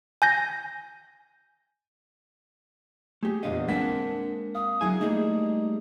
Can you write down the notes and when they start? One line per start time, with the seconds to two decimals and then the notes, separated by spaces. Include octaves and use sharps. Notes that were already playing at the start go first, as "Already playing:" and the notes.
0.22 G#5 G6 A#6
3.23 A3 G4 G#4
3.43 E2 A#2 D3 D#5 F5
3.68 G#3 A#3 C4 D4 F#5 B6
4.55 F5 D#6
4.81 D3 F#3 E4 G#4 G#5
5.01 G3 A3 A#3 D#4 G#4